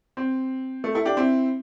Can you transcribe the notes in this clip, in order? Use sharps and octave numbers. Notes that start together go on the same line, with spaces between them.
C4
A3
E4 A4
D4 G4
C4 E4